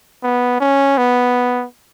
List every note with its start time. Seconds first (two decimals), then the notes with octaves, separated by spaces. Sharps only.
0.23 B3
0.61 C#4
0.98 B3